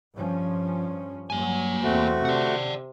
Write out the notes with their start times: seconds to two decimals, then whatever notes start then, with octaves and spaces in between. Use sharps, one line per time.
0.16 G2 F3 C#4
1.30 G2 F#3 A#3 G#5
1.83 E2 A3 C4 F#4
2.25 C3 D5 F#5